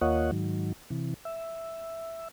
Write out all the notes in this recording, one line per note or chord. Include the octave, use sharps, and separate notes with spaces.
D#2 A#3 F4 C#5 D#5 F#5
G#2 D#3 F#3
C3 E3
E5